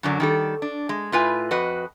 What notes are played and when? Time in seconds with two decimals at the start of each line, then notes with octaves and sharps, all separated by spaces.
0.03 F#2 D3 F#3 D4
0.20 D#3 G3 A4
0.62 D4
0.89 G#3
1.12 A2 F4 B4 G#5
1.51 F2 F#4 B4 D#5